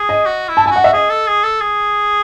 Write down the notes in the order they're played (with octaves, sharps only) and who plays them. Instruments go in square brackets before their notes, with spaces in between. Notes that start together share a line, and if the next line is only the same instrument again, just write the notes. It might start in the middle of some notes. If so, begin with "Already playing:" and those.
Already playing: [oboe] G#4
[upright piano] D#5
[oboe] F#4
E4
[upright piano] A5
[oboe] E4 [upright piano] G#5
[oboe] F#4 [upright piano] F#5
[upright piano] E5
[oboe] G#4 [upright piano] D#5
[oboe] A4
G#4
A4
G#4